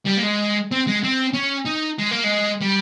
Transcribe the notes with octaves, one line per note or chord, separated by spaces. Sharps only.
G3
A#3
G#3
C4
G#3
C4
C#4
D#4
G#3
A#3
G#3
G3